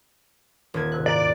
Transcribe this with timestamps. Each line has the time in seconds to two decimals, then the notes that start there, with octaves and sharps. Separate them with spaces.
0.74 D#1 G#6
0.92 G#2 C3 D#3 F#6
1.06 E2 D5 F5 A#5